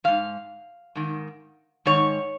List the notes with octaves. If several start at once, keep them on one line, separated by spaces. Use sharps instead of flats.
G#2 D#3 F5
G#2 D#3
G#2 D#3 C#5